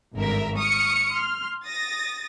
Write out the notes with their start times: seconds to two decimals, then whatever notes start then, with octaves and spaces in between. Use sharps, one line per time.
0.14 G#1 G2 D3 A#4 E5
0.56 C#6 D#6 F6 C#7
1.12 C6 F6
1.64 D#6 A6 A#6